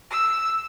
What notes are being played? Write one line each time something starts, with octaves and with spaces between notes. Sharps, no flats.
E6